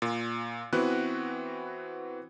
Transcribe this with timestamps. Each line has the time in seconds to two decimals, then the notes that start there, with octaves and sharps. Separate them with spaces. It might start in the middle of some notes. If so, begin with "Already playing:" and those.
0.02 A#2
0.73 E3 B3 C4 F#4 B4 F#6